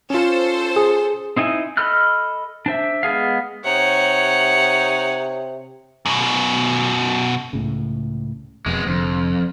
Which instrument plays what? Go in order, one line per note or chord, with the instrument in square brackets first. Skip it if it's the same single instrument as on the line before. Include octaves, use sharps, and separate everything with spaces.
[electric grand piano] C#4 F4 [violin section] A4 C5
[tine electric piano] G#4
[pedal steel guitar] C4 D#4 E4 G#5
A4 D#5 B5 F6 F#6
D4 C5 E5
G#3 B3 G#4 F5
[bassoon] C3 [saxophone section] D#4 C#5 [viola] F#5
[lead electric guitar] F#2 B2
[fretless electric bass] C#2 A2 C#3
[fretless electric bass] E1 F2 [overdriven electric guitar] G#3 B3
[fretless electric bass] F1 D3 [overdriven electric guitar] F2